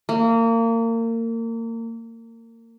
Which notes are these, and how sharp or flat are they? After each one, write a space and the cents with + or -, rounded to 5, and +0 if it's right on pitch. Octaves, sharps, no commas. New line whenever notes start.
A#3 -30